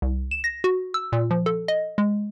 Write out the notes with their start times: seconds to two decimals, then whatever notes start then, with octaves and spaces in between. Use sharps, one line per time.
0.02 C2
0.31 E7
0.44 A#6
0.64 F#4
0.94 E6
1.12 A#2
1.31 F3
1.46 A4
1.68 D#5
1.98 G#3